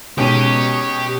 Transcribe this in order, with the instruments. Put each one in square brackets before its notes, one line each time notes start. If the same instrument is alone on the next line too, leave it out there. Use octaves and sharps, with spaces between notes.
[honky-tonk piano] B2 D#7 [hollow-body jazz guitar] G#3 C#4 D#4 [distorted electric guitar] G4 [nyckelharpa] C#5